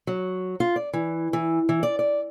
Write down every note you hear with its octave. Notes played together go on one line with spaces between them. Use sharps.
F#3
F4
D5
E3
E3
E3
D5
D5